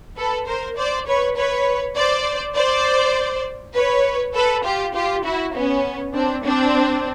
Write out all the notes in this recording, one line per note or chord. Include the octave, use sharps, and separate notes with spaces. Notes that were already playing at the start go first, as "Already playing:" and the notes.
A4 B4
A#4 C5
C5 D5
B4 C#5
B4 C#5
C5 D5
C5 D5
B4 C#5
A4 B4
F4 G4
F4 G4
E4 F#4
B3 C#4
C4 D4
C4 D4